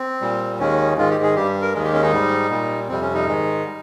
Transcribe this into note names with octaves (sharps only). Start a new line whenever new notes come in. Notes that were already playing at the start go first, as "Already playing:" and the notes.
Already playing: C4
A#2 G3
D#2 D#3 G#3 C#4
G#2 D#3 G#3 F4
G4
G#4
G2 G3 G4
A#4
D#2 D#3 G#3
G4
C#4
D#4
G#2 G3
A#2 G3
F2 C3 G3 C4
C#4
D#4
G#2 D#3 G#3
G3